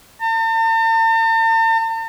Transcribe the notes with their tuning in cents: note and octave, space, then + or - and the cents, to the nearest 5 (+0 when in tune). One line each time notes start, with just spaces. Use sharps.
A5 +45